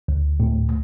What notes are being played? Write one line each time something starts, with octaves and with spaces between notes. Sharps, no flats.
D2
A2